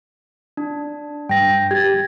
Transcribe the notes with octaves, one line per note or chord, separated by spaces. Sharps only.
D4
G2 G5 A#6
G4 G#6 A6